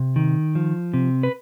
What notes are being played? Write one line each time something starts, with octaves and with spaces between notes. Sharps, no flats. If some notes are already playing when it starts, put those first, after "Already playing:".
Already playing: C3
D#3
F3
C3
B4